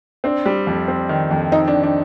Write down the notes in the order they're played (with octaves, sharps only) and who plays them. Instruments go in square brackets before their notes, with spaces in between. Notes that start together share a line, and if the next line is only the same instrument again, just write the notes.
[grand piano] C4 [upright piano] D4
[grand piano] G3
F2
C4
D#3
F2
[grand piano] C4 [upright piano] D#4
[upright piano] D4
[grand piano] D#3
[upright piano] D4